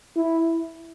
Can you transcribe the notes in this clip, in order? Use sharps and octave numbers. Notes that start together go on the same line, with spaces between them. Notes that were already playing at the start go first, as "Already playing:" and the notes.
E4